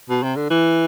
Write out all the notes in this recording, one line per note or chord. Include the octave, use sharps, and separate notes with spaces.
B2
C3
D3
E3